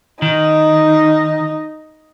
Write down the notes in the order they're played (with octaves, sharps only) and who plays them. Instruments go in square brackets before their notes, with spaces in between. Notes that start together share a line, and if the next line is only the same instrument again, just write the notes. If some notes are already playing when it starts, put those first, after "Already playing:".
[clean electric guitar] D#3 [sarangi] D#4